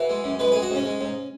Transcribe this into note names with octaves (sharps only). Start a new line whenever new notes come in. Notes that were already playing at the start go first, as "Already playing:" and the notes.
Already playing: E3 F#4
G#3
F#2
G#3 B4
G#3 G#4
F#4
G#2 C#4
G#3
G#2